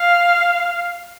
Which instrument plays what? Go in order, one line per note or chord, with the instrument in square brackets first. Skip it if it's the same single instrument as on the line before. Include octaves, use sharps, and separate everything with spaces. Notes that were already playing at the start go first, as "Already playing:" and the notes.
Already playing: [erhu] F5